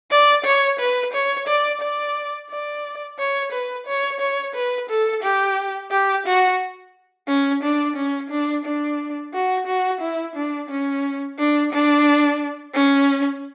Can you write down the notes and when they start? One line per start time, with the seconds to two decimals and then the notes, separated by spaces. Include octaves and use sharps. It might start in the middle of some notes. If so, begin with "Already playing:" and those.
0.11 D5
0.45 C#5
0.80 B4
1.13 C#5
1.47 D5
1.81 D5
2.50 D5
3.19 C#5
3.52 B4
3.87 C#5
4.20 C#5
4.55 B4
4.90 A4
5.23 G4
5.91 G4
6.26 F#4
7.28 C#4
7.63 D4
7.96 C#4
8.30 D4
8.65 D4
9.34 F#4
9.67 F#4
10.01 E4
10.36 D4
10.69 C#4
11.38 D4
11.73 D4
12.74 C#4